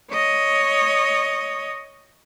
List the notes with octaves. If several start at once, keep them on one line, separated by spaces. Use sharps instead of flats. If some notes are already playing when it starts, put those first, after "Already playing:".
C#5 D#5